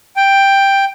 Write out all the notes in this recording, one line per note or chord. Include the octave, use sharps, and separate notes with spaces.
G5